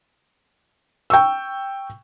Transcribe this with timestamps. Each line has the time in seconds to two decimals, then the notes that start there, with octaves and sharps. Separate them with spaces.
1.10 G5 C#6 E6